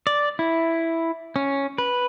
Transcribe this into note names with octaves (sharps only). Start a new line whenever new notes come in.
D5
E4
C#4
B4